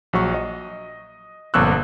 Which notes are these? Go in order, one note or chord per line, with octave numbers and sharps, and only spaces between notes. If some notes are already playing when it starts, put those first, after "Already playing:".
A#1 F#3 C#6
D#5
G1 F2 A#2 C#6 E6 F#6